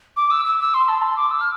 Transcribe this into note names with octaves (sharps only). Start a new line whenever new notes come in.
D6
E6
E6
E6
C6
A5
C6
D6
E6
F6